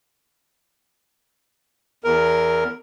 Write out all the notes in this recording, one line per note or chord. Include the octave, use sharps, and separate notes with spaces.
E2 A#4